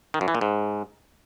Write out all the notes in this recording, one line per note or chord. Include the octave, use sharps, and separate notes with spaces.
D#3
F#2
E3
A#2
G#2